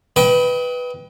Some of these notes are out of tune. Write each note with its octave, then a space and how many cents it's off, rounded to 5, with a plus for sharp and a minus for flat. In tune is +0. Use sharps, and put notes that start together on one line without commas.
B4 +0 D#5 +35 G5 +0